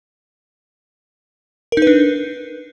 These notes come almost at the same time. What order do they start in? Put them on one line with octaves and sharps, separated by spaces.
A#4 D#4 B4 D4